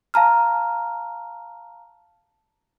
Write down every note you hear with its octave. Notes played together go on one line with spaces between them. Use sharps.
F5 A5 A#5 F6